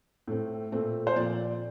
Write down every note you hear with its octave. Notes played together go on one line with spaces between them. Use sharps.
A2 A3 C4
A#2 A3 C4
C5
A#2 F3 C4 D5